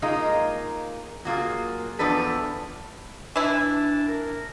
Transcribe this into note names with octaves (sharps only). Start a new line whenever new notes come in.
G#3 A#3 D#4 F4
F#3 A#3 F4 G#4
E2 F3 D4 A4 B4 A5
E3 D4 E4
A#4